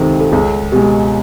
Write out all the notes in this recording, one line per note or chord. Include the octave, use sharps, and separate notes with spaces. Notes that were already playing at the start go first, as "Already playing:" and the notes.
Already playing: C#2 C3 D#3 A4
A4
C#2 G#4
B2 G#3 G4